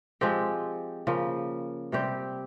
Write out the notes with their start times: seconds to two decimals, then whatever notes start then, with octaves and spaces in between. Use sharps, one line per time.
0.21 F3 G#3 C4 G4
1.07 C#3 F3 A#3
1.92 C3 G3 C4 G4